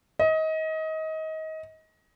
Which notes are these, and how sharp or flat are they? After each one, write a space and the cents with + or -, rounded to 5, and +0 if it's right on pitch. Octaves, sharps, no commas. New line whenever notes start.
D#5 +25